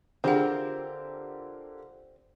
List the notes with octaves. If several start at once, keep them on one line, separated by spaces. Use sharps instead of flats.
D3 C4 D4 F4 G4 G#4 A#4 F#5